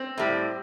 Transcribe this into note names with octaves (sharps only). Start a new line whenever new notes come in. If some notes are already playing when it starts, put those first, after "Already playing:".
Already playing: C4
A2 G3